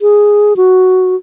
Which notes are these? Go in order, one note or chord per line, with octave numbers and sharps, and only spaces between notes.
G#4
F#4